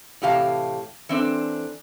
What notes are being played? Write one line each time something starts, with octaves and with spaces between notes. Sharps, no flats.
A2 C3 E3 G4 F5 A5
E3 C4 D4 A4